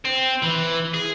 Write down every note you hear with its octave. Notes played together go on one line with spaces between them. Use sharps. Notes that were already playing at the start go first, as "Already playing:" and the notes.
C4
E3
G#4